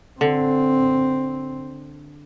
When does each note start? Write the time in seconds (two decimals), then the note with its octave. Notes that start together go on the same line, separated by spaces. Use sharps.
0.21 D3 C4